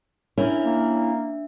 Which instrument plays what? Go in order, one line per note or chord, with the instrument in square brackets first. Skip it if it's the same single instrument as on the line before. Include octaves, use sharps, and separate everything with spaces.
[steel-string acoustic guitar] C#4 E4 A#4 [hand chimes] D4 E5
[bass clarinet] A#3